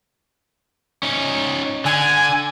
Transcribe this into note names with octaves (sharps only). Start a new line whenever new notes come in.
C#4 D#4
D3 G#5